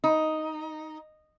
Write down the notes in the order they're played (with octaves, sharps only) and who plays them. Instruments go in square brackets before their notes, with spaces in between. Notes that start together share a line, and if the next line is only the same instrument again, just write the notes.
[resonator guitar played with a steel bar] D#4